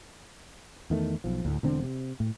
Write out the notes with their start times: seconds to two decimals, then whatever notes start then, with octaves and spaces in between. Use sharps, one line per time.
0.90 E2 D#3 A3
1.24 B1 F3
1.45 D2 A2
1.63 E1 D3 C4
1.83 C3
2.20 A2